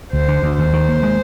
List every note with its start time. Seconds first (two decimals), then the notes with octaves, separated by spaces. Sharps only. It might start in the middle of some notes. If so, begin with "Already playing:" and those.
0.13 D2 C5
0.28 D3
0.43 D2
0.57 D#2 C5
0.73 D#3
0.88 D#2
1.03 G#3